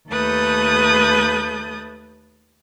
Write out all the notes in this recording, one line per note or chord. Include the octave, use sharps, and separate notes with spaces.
D#2 A3 A4 B4 D#6 G6